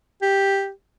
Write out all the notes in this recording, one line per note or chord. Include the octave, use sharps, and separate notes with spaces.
G4